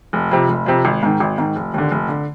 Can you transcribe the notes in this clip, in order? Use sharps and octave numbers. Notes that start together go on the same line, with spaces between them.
F1
F2 C3
F1
F2 C3
G#1
G#2 D#3
G#1
G#2 D#3
F1
D#2 D3
F1
D3